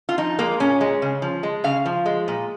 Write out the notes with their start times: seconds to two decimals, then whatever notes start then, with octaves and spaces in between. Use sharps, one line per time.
0.09 F4
0.18 F3 D#4
0.38 G#3 A#3
0.60 A#2 C#4
0.81 G#3
1.02 C#3
1.22 F3
1.43 G#3
1.64 C#3 F5
1.86 F3
2.06 G#3
2.28 A#2